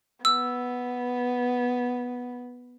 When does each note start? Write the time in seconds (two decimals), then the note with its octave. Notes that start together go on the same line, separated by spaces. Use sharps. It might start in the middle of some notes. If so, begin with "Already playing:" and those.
0.25 B3 E6